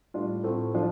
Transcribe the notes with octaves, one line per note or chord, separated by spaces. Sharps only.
A2 G3 D4 F4
A2 A3 C4 F4
F3 D4 F4